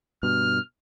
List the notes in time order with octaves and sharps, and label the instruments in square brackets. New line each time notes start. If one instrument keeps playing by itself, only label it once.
[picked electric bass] G2 B2 [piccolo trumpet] F6